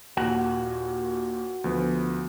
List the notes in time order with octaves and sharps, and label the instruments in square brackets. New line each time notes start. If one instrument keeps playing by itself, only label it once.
[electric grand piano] D#2 A#2 [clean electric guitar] F#4 F#5
[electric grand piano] D2 F3 B3